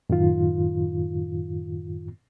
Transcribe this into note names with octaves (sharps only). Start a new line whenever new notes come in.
F#2 A2 D#3 F4